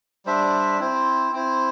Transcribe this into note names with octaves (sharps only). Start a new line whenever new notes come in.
G3 D4 C5 E5
C4 E4 C5
C4 E4 C5